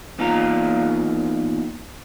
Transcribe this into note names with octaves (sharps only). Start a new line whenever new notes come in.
E2 D#3 A#3 F4 F5 A#5